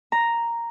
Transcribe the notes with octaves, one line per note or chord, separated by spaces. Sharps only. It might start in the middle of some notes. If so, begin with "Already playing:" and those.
A#5